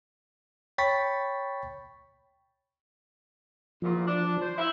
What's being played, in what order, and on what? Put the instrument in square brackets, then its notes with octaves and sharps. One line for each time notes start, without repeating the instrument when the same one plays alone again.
[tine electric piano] C#5 G5 B5 C#6 A6 B6
[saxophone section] E2 A#2 [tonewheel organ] F3
[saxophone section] D4
C5
F3 E4